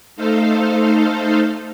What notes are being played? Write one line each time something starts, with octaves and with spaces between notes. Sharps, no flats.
A3 D#4 A4 C5 F5